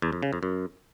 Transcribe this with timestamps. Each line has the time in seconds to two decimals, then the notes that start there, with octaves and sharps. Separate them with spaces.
0.02 E2
0.12 F2
0.23 C#3
0.33 F2
0.43 F#2